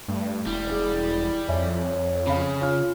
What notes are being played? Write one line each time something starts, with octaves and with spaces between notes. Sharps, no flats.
G2 A3
E1 G3 E4
G#4
F2 C#5 E5 G#5
C#3 F5 B5
C#4 F4 F6